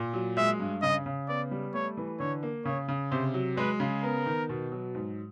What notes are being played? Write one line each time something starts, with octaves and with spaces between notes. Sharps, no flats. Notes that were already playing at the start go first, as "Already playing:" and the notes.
Already playing: A#2
F#3
G#3 E5
G2
C#3 D#5
C#3
B3 D5
G3
A3 C#5
E3
D3 C#5
A#3
C#3 C#5
C#3
C3 C5
F#3
G#3 B4
C#3
B3 A#4
D#3
B2
F#3
G#2